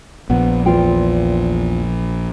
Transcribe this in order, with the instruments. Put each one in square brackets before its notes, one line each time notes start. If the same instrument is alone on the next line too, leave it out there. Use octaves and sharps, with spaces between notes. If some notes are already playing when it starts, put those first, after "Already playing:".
[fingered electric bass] A#1 [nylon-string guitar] B3
[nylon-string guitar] E2 F4 G5